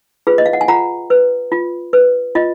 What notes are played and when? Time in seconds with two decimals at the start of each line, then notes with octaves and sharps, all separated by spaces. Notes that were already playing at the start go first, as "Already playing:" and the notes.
0.27 F4 G#4 B4
0.38 D#5
0.46 F5
0.53 F#5
0.61 G#5
0.68 F4 F#5 A#5
1.10 B4
1.52 F4
1.93 B4
2.35 F4 D#5